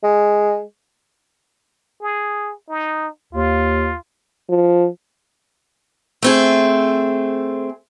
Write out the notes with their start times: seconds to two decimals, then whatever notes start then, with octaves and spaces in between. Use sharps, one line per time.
0.04 G#3
2.01 G#4
2.69 D#4
3.33 D#2 F4
4.49 F3
6.23 A3 C4 G#4